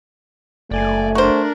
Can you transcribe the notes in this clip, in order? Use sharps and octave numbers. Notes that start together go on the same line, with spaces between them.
F#1 A3 D5 G#5
D4 F#4 A#4 C5